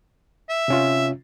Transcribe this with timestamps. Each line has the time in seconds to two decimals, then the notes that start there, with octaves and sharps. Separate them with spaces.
0.49 E5
0.68 C3 C#4 F4